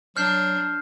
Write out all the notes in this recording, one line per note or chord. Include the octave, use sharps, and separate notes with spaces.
F#3 D4 F6 G6 C7